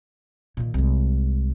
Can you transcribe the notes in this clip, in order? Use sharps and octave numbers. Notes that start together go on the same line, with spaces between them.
A#2 D#3
C2 G#3